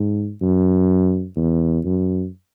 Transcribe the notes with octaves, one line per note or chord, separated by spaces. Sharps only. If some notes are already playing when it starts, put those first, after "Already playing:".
Already playing: G#2
F#2
E2
F#2